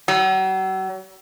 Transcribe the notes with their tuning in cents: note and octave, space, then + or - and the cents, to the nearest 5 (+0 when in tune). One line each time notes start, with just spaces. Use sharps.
F#3 +40